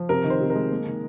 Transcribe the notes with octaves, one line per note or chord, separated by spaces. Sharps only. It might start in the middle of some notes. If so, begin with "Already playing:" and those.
Already playing: F3
C3 A#4
D#3
C5
C3
A#4
G#3
A#3
D#3